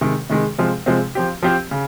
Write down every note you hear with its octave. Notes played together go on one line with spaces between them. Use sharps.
C3 D#3 G#3
C3 D#3 G#3
C3 F3 G#3 C4
C3 F3 G#3 C4
F3 C4 G4
F3 C4 G4
C#3